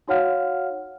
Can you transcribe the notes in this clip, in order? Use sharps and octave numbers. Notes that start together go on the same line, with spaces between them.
D#4 F#4 C#5 F5 F#5 F6